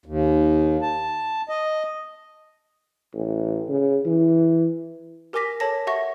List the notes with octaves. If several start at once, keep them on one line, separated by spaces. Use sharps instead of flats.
D#2
A5
D#5
A1
C#3
E3
G4 A#4 G#5 D6 A#6 B6
A4 C#5 A5 A#6
G4 E5 F#5 C#6 A#6